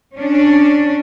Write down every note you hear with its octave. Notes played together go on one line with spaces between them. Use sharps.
C#4 D4